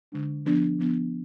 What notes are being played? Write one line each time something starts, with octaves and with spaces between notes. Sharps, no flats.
D3 G#3 D4
F3 B3 D4
F3 B3 D4